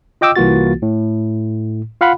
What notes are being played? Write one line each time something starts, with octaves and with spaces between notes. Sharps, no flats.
F4 D#5 G5 D6 E6
C2 E3 A#3 F4 F#4 A6
A2
F4 F5 F#5 B5